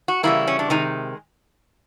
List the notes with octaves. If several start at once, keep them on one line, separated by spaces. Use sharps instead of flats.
F#4
C#3 E3 G3 A#3 E4
C#4
D4
C3 D#3 G#3 D#4